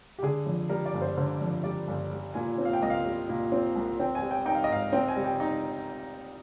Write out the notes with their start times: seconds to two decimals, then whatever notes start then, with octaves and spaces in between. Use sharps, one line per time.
0.19 G4
0.23 D3 G#4
0.46 F2
0.69 G3 A#4
0.86 D5
0.94 G1
1.02 C5
1.17 D3 C5
1.41 F2
1.64 G3 D5
1.88 G1
2.12 G3
2.34 A#2 G#5
2.58 C4
2.65 F5
2.73 G5
2.82 C2 D#5
2.90 F5
3.06 G3
3.29 A#2
3.52 C4
3.76 C2
4.00 C4 G5
4.15 G#5
4.22 G3
4.31 G5
4.46 D#4 G5
4.55 F5
4.64 D#5
4.70 G#2 F5
4.93 C4 G5
5.08 G#5
5.16 G3
5.24 G5
5.40 D#4